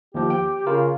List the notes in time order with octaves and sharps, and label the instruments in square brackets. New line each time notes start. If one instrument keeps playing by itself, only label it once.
[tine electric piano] D#2 F3 [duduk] G4
[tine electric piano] G5
[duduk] C#3 [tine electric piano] F4 A#4